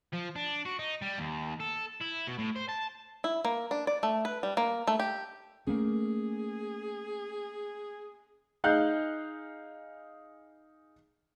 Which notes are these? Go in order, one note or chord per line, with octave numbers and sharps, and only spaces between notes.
F3
D4
F#4
D#4
G3
D#2
A4
E4
B2
A2
C5
A5
E4
A#3
D4
D5
A3
B4
G3
A#3
A3
G4
A3 A#3 C#4 G#4
D#4 G#4 F5 F#6 G6